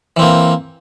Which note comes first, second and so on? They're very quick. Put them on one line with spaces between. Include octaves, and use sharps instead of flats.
E3 C4 A#3